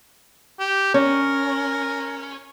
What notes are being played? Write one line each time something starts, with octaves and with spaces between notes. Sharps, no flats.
G4
C#4 A#4